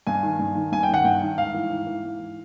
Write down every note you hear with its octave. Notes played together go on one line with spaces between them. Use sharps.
G2 G#5
D#3
G2
D#3
G2 G#5
G5
D#3 F#5
G2 G5
D#3
G#2 F5
E3
G#2
E3
G#2
E3